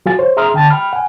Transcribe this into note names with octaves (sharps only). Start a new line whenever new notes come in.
F#3 F4 F#4 F5 G#5 A6
C5 C#5
G#4 E5 A#5 C6 D#6 F6
D3 G5 A5 A6
G5 B5 F6
F#5 G#5